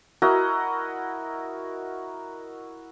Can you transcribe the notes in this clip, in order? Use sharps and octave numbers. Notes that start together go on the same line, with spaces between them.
E4 F#4 A#4 D#5